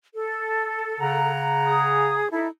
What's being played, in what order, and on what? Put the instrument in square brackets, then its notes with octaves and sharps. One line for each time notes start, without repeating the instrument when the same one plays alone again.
[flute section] A4
[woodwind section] C#3 F#5 A#5
[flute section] G#4 D#6
D#4 E4 A4